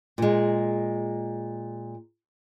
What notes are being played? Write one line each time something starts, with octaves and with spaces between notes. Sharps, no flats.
A#2 G#3